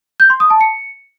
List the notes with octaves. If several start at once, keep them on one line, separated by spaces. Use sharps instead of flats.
G6
C6
D#6
A5
C#7